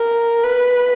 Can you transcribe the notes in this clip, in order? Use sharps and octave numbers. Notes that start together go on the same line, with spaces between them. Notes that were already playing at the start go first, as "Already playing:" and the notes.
Already playing: A#4
B4